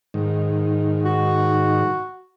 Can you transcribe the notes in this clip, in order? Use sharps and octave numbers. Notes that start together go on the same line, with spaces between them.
G#2 D#3
F#4